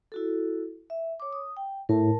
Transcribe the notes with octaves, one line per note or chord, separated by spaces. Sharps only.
E4 F#4 A4
E5
C#5 D6
D#6
G5
A2 A#4 A5